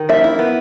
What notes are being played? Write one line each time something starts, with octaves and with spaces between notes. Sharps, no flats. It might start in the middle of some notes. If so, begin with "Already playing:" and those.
Already playing: D#3
A#3 E5
E4
B3